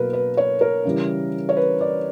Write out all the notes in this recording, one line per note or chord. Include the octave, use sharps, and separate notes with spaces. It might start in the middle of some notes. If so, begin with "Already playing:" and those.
Already playing: B2 F#3 A#3 A#4 B4
B4
C#5
A#4
C#3 E3 G3
C#5
B4
D5